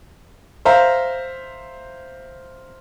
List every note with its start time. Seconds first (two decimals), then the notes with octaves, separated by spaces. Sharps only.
0.65 C5 E5 F5 A#5